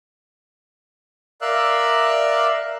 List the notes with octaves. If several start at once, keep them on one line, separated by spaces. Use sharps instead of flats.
A#4 D5 E5 F5 E6 F#6